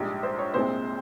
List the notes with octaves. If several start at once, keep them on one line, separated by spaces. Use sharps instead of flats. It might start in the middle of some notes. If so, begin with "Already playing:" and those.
Already playing: A#1 G#2 G3
C5
C#5
C2 A#2 G#3 C4 C5